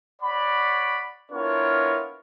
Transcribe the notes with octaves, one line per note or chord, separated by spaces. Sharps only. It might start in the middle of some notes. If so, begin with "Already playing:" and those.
C#5 D5 F#5 B5
B3 D4 E4 F4 A#4 C#5